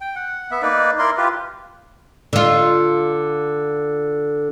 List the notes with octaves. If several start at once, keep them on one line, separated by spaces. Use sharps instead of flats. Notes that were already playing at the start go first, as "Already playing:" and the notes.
G5
F#5
B3 E5
A#3 D#4 B4 D5
E4 A#4 D5 C6
F4 G4 B4
D3 F4